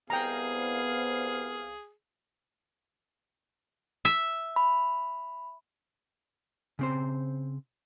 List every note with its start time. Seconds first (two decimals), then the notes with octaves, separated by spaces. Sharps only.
0.10 C2 B3 G#4 F5 G5 A#5
4.05 E5
4.56 B5
6.79 C#3 C4 C5